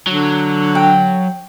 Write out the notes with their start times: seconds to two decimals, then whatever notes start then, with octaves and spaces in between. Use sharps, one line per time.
0.07 D3 F#3
0.75 G5